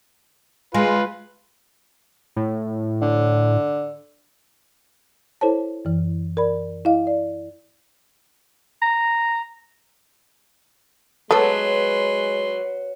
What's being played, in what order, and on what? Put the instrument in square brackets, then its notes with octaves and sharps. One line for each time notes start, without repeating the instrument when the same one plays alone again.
[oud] G#3 [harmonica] F4 B4
[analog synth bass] A2
[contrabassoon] D3
[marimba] E4 A4 C5 C#5 A5
F#2 E3
A#4 D5 B5
E4 D#5 F5
D5
[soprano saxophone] A#5
[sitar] F#3 [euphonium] G#3 [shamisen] A3 B3 A4 [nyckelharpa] B4 C6